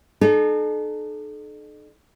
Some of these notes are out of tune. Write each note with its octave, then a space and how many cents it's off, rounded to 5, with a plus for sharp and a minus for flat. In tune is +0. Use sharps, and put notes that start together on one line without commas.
D#4 -45 A4 -35